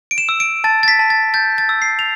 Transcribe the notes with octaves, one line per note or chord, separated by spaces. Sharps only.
D7
E7
E6
D7
A5 A6
A6
B6
A5
A6
G6 A6
A6
E6
C7
F7